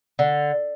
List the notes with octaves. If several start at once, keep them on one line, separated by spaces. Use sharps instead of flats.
D3